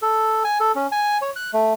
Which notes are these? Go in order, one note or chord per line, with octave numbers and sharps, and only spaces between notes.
A4
G#5
A4
C#4
G#5
C#5
F#6
A3